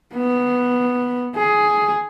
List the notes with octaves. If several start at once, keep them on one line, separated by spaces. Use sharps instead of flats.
B3
G#4